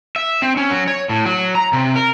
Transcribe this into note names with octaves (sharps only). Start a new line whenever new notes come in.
E5
C4
C#4
F#3
C#5
A2
F#3
A#5
C3
A#4